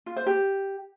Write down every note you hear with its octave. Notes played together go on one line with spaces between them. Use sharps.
F4
C5
G4